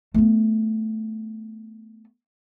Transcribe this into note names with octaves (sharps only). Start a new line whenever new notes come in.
A3 B3